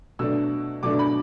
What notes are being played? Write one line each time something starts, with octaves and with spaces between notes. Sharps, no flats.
B2 F#3 A3 D4 E6
B2 F#3 A3 D4 D6
B5